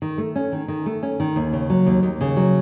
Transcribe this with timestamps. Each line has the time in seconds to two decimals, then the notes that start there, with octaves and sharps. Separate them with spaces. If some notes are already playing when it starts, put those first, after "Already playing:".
0.02 D#3
0.18 A3
0.36 C#4
0.52 D#3
0.68 D#3
0.86 A3
1.03 C#4
1.20 D#3
1.36 D#2
1.53 C#3
1.70 F#3
1.86 D#2
2.03 D#2
2.21 C#3
2.36 F#3